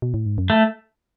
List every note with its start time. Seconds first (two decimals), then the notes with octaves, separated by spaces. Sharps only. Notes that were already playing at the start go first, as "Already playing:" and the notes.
0.02 B2
0.14 A2
0.26 G#2
0.38 F#2
0.50 A3